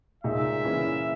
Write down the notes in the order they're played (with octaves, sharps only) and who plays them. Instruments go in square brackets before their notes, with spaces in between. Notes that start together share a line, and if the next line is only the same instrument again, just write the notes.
[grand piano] A#2 G#3 D#4 [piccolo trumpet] E5
[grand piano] C#3 E3 A#3 C#4 E4